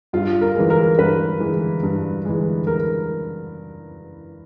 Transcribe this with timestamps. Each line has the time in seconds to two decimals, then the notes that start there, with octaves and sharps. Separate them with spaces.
0.13 G2 F4
0.41 A#4
0.55 E3 G#3
0.70 A#4
0.98 G2 B4
1.40 E3 G#3
1.83 G2
2.25 E3 G#3
2.67 A#4